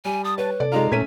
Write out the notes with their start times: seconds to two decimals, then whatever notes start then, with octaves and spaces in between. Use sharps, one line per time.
0.05 G3 G#5
0.24 A5 D#6
0.38 B4 C#5
0.60 C3 A4 D5
0.72 G#3 D#4 F4 A#5
0.92 A#2 A3 C#4 G#6 B6 D#7